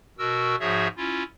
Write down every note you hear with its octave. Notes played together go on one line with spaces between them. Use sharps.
B2 F#4 A#4 E6
G#2 F3 F#4 G#4 C#5 E5
C#4 E4 F4